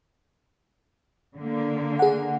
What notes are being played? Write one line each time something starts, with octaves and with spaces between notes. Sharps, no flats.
D3 A#3
G#4 F#5